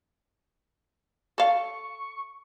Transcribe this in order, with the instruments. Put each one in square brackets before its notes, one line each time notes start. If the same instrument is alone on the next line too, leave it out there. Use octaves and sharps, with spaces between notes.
[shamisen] A4 F5 [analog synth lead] C#6